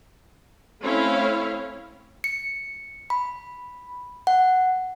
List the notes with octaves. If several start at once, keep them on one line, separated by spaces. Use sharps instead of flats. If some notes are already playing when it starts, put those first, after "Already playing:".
A3 C4 C#4 E4 C#5 F5
C#7
B5
F#5